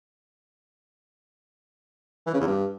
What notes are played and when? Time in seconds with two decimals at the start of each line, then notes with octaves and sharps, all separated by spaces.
2.27 E3
2.34 C#3
2.40 E2
2.47 G2